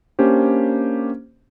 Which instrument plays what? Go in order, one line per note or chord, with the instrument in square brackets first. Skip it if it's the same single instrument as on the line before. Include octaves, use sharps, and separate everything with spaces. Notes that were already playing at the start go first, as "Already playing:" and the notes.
[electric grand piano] A#3 C#4 D4 G4 C5